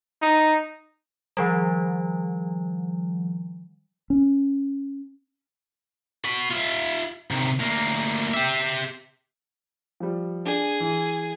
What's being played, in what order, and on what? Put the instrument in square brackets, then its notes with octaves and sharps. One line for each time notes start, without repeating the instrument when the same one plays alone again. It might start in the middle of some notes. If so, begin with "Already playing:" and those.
[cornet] D#4
[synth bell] D#3 F3 G3
[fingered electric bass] C#4
[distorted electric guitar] F#4 B5
F4 E5
C3 D#3
D2 A#3
G4 E5
[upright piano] F3 G3
[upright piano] D4 [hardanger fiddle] G#4
[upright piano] E3